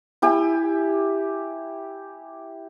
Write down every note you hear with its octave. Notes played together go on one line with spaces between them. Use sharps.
E4 G4 G#5